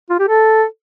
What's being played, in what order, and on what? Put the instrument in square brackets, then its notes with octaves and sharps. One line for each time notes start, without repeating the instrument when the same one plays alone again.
[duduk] F4
G4
A4